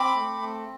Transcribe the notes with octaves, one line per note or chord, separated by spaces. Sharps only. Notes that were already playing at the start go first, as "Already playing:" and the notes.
Already playing: C4 B5 D6
A3
C4